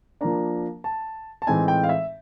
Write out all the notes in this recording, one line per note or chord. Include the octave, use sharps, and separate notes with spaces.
F3 A#3 D4 A#5
A5
A5
A2 E3 G#3 C4 D#4 G#5
G5
F5
E5